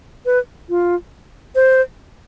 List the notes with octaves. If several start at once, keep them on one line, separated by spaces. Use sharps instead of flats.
B4
F4
C5